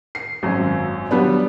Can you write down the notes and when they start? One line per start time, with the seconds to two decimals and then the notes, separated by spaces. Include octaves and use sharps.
0.15 C7
0.43 G#1 F#2
1.11 F#3 G3 B3 D4